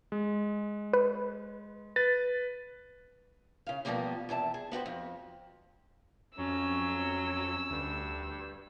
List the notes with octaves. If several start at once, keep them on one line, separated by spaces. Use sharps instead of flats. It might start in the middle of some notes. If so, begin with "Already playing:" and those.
G#3
B4
B4 A6
C#3 F5
B2 D#3 F3 G3 A#3 B3
E2 C3 A4 A5
G#4
B3 F#4 G4 C5
F2
F2 F#3 C#4 E6
D2 G2